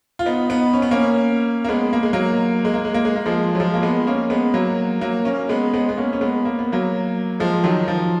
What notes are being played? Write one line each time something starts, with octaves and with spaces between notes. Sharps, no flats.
F4
B3 D#4
B3 D#4
C#4
B3
A#3 C#4
A#3
G#3 B3
A#3
G#3
F#3 A#3
G#3
A#3
G#3
A#3
G#3
A#3
F3 G#3
F#3
F3 G#3
A#3
G#3 B3
A#3 C#4
G#3 B3
F#3 A#3
F#3 A#3
A#3 C#4
G#3 B3
G#3 B3
B3
A#3 C#4
C#4
G#3 B3
A#3
B3
F#3 A#3
F3 G#3
D#3 F#3
F3